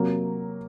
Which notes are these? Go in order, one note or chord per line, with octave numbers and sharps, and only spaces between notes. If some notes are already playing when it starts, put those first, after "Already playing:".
Already playing: C3 F#3 A#3